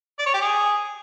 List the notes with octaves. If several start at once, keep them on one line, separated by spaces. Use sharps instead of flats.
D5
C#5
G4
G#4